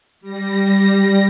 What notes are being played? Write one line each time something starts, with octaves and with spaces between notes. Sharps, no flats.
G3 A#6